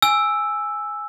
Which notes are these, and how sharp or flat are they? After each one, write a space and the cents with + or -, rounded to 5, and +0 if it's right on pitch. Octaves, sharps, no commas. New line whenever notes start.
G#5 +0 E6 +0